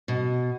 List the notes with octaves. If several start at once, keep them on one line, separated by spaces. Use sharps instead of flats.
B2